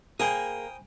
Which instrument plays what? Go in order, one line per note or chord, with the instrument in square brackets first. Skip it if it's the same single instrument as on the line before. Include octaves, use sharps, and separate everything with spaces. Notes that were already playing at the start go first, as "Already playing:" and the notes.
[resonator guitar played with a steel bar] A#3 [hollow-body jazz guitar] G#4 [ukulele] C5 G#5 B5 [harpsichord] G5 A#5 D#6